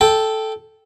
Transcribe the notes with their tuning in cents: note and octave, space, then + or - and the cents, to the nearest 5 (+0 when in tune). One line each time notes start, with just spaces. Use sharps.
A4 -5 G5 +0